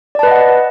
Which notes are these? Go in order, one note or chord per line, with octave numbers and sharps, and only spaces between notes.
B4 D5 D#5 F#5 A5